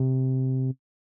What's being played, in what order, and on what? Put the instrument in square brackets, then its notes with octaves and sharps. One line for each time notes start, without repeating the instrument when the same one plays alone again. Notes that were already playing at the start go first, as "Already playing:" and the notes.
Already playing: [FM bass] C3